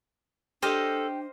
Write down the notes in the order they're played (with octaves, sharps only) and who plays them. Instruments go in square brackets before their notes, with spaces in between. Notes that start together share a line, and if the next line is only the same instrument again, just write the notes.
[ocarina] D4 [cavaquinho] G4 G5 D6 [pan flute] A4 [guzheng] C5 D#5 F5